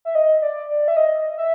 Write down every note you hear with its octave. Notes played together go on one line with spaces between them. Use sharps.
E5
D#5
D5
D5
E5
D#5
E5